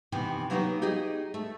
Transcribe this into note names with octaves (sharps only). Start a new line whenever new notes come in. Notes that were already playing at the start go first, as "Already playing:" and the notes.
C3 D#3 E3 B3
F#3 A#3 B3 C#4 D#4 G4
D#4 G4 G#4 D#5
A3